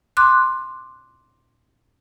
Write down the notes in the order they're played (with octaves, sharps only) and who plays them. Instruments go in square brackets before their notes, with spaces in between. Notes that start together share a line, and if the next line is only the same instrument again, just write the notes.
[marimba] C6 D6 F#6